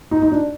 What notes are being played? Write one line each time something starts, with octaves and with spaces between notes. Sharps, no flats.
D#4
D#4
D4